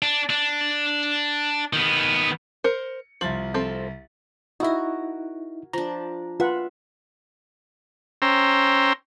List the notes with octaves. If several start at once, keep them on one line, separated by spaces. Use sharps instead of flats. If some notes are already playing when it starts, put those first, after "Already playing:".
D4
D4
D#3 B3
A#4 C5 C#7
C2 F3 A6 F#7
F3 C4 A4
D#4 E4 F#4 A#4
F3 D4 A#5
F4 B4 E5 F#5
C#4 C5 G5 A#5 E6